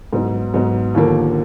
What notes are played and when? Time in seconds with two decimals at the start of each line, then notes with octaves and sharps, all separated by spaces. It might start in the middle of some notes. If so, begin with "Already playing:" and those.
0.13 G#2 F#3 B3 D#4
0.54 G#2 F#3 B3 D#4
0.94 D#2 D3 F3 A#3